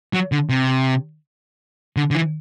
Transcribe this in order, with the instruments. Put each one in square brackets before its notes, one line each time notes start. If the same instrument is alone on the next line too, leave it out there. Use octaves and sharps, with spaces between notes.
[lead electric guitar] F#3
D3
C3
D3
D3
E3